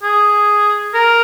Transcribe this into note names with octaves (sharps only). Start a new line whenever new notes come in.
G#4
A#4